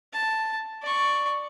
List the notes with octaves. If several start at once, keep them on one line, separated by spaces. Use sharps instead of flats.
A5
D5 C#6